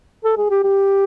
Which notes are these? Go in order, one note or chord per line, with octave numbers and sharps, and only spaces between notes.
A4
G#4
G4
G4